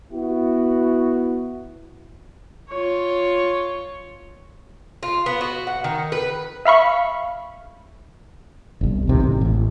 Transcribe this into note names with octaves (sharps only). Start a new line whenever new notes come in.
B3 E4 F#4
F4 C#5
F4
B3
F#4
F#5
D#3
B4
E5 F5 B5 C#6
G1 C2
C#2 C3 D#3
A1
A1